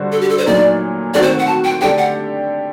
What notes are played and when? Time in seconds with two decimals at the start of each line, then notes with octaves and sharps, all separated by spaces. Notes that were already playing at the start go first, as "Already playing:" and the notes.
Already playing: D3 G3 D4 F#4 C5
0.12 A4
0.21 G4
0.30 A4
0.38 C5
0.46 A#2 F#3 A3 D#4 D5
1.14 D#3 A3 C4 F#4 D5
1.22 C5
1.39 F#5
1.47 A5
1.64 G5
1.81 D3 A3 D4 G4 G5
1.98 F#5